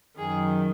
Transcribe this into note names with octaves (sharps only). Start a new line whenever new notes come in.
F#2 D#3 G#4